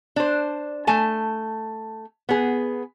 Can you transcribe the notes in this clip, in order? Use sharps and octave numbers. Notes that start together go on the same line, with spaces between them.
D4 C5
A3 G#5 A5
B3 G#4